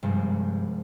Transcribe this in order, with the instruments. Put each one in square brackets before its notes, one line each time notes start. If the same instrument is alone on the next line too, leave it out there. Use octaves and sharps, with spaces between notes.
[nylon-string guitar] G2 [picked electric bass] C3 F3 G#3